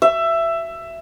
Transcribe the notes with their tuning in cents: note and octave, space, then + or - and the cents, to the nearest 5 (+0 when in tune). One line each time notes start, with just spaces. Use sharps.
E5 +15